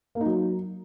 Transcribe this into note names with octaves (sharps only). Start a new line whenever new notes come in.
A#3
D#4
F#3